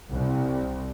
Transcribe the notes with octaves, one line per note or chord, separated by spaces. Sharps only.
C2